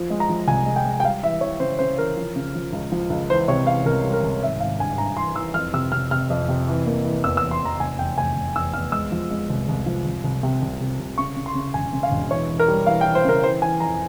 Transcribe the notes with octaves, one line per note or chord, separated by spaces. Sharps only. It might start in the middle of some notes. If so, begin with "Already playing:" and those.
Already playing: F3
G#3
A#5
F3
C2 G#5
G#3
G5
G#3
G5
G3 F5
E3 E5
E3 C#5
C#3 C5
C#3 C5
E3 A#4
F3
C#3
F3
C#2
F3
C#2
E3 C5
C3 C#5
E3 F5
C2 A#4
G3
A#4
C2
G#1 E5
G#1 F5
G2 G#5
G2 A#5
E3 C6
E3 E6
F2 F6
C3 E6
C3 F6
C3 F6
F2
C3
E3
A#3
E3
E2 E6
E6
E3
C6
E2 A#5
F1 G#5
E2 G5
F1 G#5
F1
E2 E6
E2 F6
G#3 E6
F3
G#3
C2
C2
F3
C2
C2
C3
C2
C3
C2
C#3 C#6
C#3
C6
C#3
E1 G#5
C#3
F5
E1
E3 C#5
E3
A#4
G3
E3 F5
G5
E3
C5
C#3 A#4
E3 C5
E3 G#5
F2 A#5